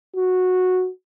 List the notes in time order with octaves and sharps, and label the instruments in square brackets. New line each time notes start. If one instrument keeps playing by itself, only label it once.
[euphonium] F#4